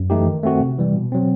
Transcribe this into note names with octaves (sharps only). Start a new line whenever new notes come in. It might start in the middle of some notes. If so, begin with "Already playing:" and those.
Already playing: F#2
E3 A3 D#4 G4
D#3
A3 C4 F#4
C3
E3 G3
B2
F#3 C4